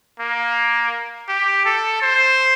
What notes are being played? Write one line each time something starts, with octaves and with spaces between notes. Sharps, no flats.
A#3
G4
A4
C5